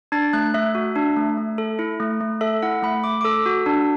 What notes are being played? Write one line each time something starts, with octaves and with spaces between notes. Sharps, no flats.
D4 A6
A3 F#6
A3 E5
F#4
D4
A3
A3
A4
E4
A3
A3
A4 E5
E4 F#5
A3 B5
A3 D6
D6
A4 E6
F#4
D4